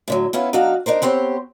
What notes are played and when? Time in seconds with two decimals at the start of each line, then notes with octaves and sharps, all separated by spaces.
0.08 A2 D3 F#3
0.33 B3 C#4 E4 F4
0.53 F#3 D4 D#4 F#4 F5
0.86 D4 D#4 A#4 C5
1.02 B3 C4 G4 C5 C#5